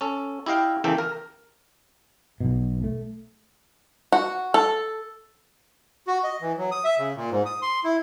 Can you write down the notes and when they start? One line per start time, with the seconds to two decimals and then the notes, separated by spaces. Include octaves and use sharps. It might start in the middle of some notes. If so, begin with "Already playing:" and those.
0.01 C#4 A4
0.46 E4 G4 D#5 F5 G5
0.84 E2 C#3 E3 A#3 A4 G5
0.98 A#4
2.40 B1 B2
2.84 A3
4.12 F#4
4.54 A4
6.07 F#4
6.24 D#5
6.41 E3
6.58 F#3
6.72 D#6
6.84 E5
6.99 C#3
7.16 A#2
7.30 G#2
7.46 D#6
7.62 C6
7.84 E4